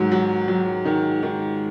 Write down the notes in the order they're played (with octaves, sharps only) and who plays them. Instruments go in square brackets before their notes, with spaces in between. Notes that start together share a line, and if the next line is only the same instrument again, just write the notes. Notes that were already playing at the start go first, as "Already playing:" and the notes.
Already playing: [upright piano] G#2 D#3 F#3
F#3
F#3
D#3
D#3